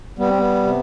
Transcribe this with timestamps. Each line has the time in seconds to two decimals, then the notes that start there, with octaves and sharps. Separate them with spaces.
0.18 G3 B3
0.28 C4
0.38 B3
0.63 C3